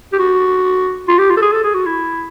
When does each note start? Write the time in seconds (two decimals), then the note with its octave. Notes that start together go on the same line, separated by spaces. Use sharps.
0.13 G4
0.19 F#4
1.08 F4
1.19 G4
1.30 F4
1.37 A4
1.42 G#4
1.52 A4
1.64 G#4
1.74 F#4
1.86 E4